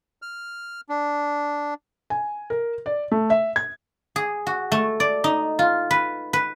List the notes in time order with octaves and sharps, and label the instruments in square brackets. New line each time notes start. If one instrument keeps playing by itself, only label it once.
[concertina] F6
D4
[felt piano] G#5
A#4
D5
A3
E5
G#6
[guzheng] G#4
F#4
A3
D5
D#4
F4
B4
B4